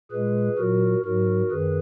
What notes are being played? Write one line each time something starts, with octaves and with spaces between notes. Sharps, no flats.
A#2 G#3 G#4 B4
A#2 F#3 F#4 A#4
G#2 F#3 F#4 A#4
F#2 D#3 G#4 B4